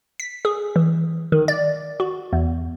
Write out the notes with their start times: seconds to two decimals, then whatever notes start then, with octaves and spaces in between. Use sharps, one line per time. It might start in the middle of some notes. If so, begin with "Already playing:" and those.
0.20 B6
0.45 G#4
0.76 E3
1.32 D#3
1.48 D5
2.00 F#4
2.33 E2